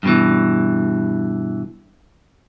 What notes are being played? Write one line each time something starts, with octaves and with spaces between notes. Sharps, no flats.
G2 B2 E3